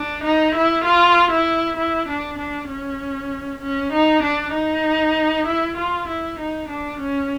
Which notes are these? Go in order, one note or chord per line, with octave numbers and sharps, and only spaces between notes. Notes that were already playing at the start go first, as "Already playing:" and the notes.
Already playing: D4
D#4
E4
F4
E4
E4
D4
D4
C#4
C#4
D#4
D4
D#4
E4
F4
E4
D#4
D4
C#4